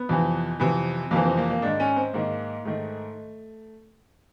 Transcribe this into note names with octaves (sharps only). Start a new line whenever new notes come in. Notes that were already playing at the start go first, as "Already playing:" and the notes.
Already playing: B3
F2 C3 E3
F2 C3 E3
F2 C3 E3 A#3
C4
A#3
A#3
G#2 D#3 D4
C#4
C4
G#2 D#3 A#3
G#2 D#3 A3